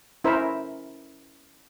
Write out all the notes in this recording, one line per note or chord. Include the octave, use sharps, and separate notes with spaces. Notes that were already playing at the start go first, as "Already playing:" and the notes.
C#4 E4 A#4 C5 E5